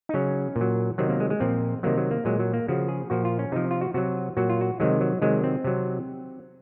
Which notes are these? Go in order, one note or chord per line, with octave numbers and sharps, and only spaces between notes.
D#4
C#3 F#3 C#4
A#2
F#3
C3 D#3 F#3 C4
A#3
G#3
G#3
A#2 F3 C4
C3 D#3 F#3 A#3
F#3
A#3
A#2 F#3 G#3
F#3
A#3
C#3 F3 F#4
G#4
A#2 F3 F#4
F4
C#4
C3 F3 D#4
F4
F#4
C3 F#3 F#4
A#2 F#3 F#4
F4
F#4
C3 D#3 F#3 G#3
F#3
C3 D#3 F#3 G#3
C4
C3 F#3